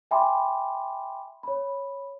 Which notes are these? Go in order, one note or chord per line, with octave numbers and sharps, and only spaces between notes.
E5 G5 G#5 B5 C6 D6
C#5 B5